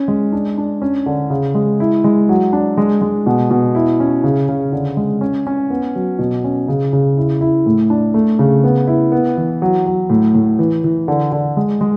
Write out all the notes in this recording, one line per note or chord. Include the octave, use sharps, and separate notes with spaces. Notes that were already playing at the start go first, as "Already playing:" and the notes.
Already playing: C#4
G#3
D4
D4
C#4
D3
C#3
G#3
E4
G#3
F#3
D4
G#3
G#3
B2
B2
E4
C#4
C#3
C#3
D3
G#3
C#4
C#4
B3
F#3
B2
C#4
C#3
C#3
E4
E4
A2
D4
A3
C#3
B3
E4
B3
E3
F#3
F#3
A2
A2
E3
E3
D3
D3
G#3
G#3